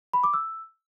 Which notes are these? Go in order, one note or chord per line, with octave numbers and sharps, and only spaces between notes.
B5
D6
E6